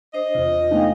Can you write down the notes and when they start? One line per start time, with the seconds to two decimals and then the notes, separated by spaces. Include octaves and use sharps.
0.14 D4 C5 D#5
0.35 E2 C3 F4
0.71 A3 B3 D4 D#4 F5 G5 G#5